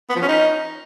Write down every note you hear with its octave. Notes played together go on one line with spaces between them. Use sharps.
B3
F3
C#4
D#4